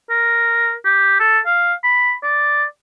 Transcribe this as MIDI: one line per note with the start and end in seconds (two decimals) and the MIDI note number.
0.10 0.74 70
0.85 1.18 67
1.19 1.39 69
1.46 1.74 77
1.84 2.13 83
2.23 2.64 74